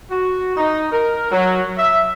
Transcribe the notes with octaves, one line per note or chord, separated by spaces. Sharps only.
F#4
D#4
A#4
F#3
E5